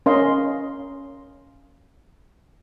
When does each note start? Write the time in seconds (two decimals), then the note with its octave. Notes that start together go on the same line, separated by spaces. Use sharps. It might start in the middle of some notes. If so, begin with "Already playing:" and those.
0.06 C#4 A#4 D#5 F5 C6